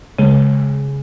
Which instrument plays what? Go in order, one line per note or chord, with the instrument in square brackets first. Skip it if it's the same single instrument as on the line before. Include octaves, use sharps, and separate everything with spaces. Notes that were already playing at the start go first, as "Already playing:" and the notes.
[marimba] C#3 [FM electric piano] G#3